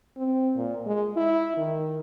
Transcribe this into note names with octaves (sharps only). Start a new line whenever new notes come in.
C4
A#2
G#3
E4
D#3